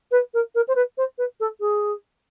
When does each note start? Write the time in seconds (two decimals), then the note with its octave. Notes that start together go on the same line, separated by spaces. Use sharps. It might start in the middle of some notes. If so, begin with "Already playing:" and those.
0.11 B4
0.34 A#4
0.55 A#4
0.68 C5
0.75 B4
0.98 C5
1.18 B4
1.40 A4
1.60 G#4